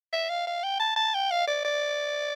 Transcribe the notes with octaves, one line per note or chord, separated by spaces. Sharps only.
E5
F5
F5
G5
A5
A5
G5
F5
D5
D5